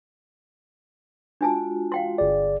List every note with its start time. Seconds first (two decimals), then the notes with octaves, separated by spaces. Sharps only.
1.41 G#3 D4 F4 F#4 G#5 A5
1.92 F5 G5 C6
2.18 G1 G#4 D5